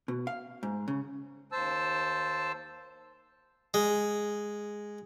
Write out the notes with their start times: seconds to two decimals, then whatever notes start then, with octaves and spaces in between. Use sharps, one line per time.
0.08 B2
0.27 F5
0.63 G#2
0.88 C#3
1.52 D#2 C5 A5 E6
3.74 G#3